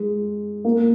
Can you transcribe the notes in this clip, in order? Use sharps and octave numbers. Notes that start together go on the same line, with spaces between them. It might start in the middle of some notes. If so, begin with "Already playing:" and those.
Already playing: G#3
A#3